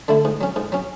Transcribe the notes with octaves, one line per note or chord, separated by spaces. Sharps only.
D3 A3 E4
G#2
F#3 C#4
G#2
F#3 C#4